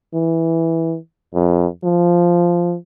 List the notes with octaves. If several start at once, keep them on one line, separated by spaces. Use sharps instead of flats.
E3
F2
F3